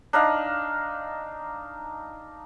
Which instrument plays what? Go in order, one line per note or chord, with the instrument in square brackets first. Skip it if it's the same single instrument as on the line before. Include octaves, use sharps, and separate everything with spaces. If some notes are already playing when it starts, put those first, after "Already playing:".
[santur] D4 D#4 F5